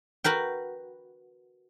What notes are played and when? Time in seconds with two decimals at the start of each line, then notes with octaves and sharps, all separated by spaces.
0.24 F#4 A#4 B4 G5